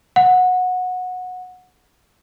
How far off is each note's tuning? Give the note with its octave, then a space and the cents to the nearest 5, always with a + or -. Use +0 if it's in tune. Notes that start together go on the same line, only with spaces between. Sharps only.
F#5 -20